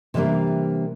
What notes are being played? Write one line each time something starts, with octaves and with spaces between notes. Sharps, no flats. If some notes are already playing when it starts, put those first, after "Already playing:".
C3 E3 G3 A#3 D4